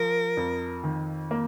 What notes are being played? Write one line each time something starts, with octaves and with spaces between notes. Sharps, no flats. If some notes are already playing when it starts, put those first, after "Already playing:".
Already playing: F3 A#4
F2
D#3
A#3